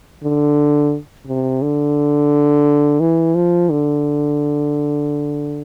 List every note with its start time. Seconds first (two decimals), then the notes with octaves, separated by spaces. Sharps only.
0.23 D3
1.27 C3
1.62 D3
3.00 E3
3.35 F3
3.70 D3